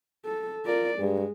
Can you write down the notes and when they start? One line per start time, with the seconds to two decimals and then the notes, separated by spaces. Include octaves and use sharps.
0.25 A4
0.66 F4 A#4 D5
0.99 G2 G#3